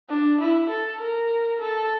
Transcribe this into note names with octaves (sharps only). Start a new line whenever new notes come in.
D4
E4
A4
A#4
A4